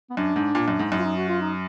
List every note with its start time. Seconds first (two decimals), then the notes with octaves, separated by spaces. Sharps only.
0.10 B3
0.17 F#2 D4
0.36 G#2
0.55 A#2
0.68 F#2
0.79 G#2
0.92 F#2 D#4
0.99 F4
1.04 D#4
1.16 F#4
1.29 F4
1.41 D#4